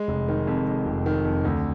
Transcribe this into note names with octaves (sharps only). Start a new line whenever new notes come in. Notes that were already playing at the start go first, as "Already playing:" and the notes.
Already playing: G#3
F1
D#3
F2
G#3
F1
D#3
F2
D2